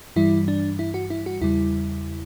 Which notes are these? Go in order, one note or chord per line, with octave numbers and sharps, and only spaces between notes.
G2 E3 G3 E4
D4
E4
F#4
E4
F#4
E2 C#3 G3 E4